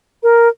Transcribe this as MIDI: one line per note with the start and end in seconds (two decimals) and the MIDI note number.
0.23 0.48 70